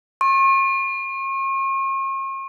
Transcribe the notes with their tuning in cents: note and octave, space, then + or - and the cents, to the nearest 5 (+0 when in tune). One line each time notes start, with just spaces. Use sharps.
C#6 -45